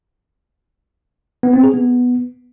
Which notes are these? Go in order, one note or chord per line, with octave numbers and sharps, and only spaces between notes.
B3
C4
G#4
B3